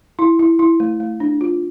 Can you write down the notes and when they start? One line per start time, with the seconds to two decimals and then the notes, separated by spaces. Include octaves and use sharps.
0.19 E4
0.39 E4
0.59 E4
0.80 A3
1.00 A3
1.20 D4
1.41 F4